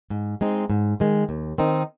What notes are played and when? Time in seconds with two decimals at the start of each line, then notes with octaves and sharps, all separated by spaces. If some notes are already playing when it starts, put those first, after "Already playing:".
0.10 G#2
0.41 G#3 C4 D#4
0.70 G#2
1.00 D#3 G#3
1.29 D#2
1.58 D#3 C4 D#4